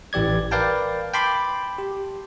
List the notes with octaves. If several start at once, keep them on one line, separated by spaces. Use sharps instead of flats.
A1 E3 G4 D5 G#6
A#4 B4 D5 F5 G5 A5
G5 A5 B5 C6 D6
G4